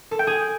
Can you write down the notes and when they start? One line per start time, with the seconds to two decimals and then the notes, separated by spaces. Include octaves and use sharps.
0.11 A4
0.19 G5
0.27 G#4